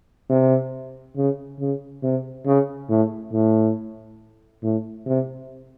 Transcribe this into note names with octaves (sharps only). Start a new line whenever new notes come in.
C3
C#3
C#3
C3
C#3
A2
A2
A2
C3